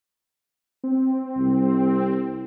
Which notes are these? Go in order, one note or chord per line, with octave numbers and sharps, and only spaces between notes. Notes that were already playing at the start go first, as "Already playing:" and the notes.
C4
C2